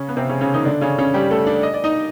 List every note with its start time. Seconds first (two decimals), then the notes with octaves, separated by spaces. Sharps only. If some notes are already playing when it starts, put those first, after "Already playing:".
Already playing: C#3 C#4
0.09 B3
0.17 C3 C4
0.29 C#3 C#4
0.41 C#3 C#4
0.54 D#3 D#4
0.65 D3 D4
0.81 C#3 C#4
0.98 C#3 C#4
1.14 G3 G4
1.31 A3 A4
1.46 D4 D5
1.63 D#5
1.74 D5
1.84 D#4 D#5